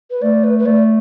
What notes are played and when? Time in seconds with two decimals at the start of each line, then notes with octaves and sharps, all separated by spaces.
0.10 B4
0.22 A3 D5
0.44 B4
0.59 B4
0.66 A3 D5